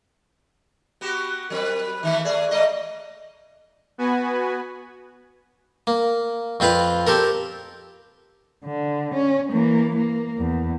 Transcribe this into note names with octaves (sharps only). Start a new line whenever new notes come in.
B3 F#4 G4
F#3 C4 A#4 B4
D#3 E3 A3 E5
A3 G#4 D5
G#3 A3 D#5
B3 F#4 B4 G#5
A#3
F2 C4 F4 B4 F5
C4 G4 A4 A#4
D3
C#4
E3 A#3
A#3
E2